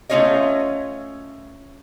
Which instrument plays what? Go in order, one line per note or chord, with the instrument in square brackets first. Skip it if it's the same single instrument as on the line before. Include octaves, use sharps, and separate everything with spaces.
[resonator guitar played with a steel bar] A3 A#3 C#4 F4 C#5 D#5